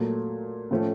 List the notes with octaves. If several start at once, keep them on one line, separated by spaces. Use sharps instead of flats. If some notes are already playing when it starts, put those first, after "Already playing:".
Already playing: A#2 F#3 A3
A2 F3 A3 C#4